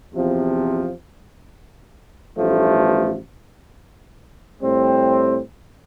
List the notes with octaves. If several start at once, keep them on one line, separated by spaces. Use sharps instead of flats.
E2 C3 F3 C4
A1 G2 F3 A3
A2 G3 C4